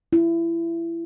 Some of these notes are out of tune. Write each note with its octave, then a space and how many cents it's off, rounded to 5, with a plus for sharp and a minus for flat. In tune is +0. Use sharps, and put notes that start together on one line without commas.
E4 +25